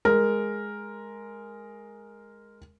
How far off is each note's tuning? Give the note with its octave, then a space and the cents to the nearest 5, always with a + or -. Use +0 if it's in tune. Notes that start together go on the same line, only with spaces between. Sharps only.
G#3 +0 A#4 +0